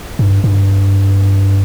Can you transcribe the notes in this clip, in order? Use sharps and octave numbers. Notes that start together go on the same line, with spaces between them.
G2
G2